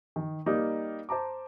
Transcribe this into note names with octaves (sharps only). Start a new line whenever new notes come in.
D#3
G3 A#3 D#4 A#4 D5
C5 A5 A#5 D6